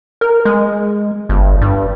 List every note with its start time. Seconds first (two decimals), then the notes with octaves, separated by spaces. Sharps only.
0.21 A#4
0.45 G#3
1.29 G1
1.61 G2